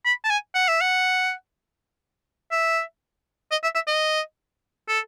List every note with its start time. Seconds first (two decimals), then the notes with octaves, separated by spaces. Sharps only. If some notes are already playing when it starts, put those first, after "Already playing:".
0.05 B5
0.24 A5
0.30 G#5
0.55 F#5
0.68 E5
0.81 F#5
2.51 E5
3.51 D#5
3.63 E5
3.75 E5
3.87 D#5
4.88 A4